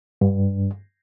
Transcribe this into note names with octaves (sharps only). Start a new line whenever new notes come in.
G2